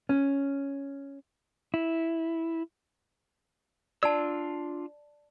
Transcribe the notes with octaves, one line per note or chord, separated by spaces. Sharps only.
C#4
E4
D4 F4 D5 A5 E6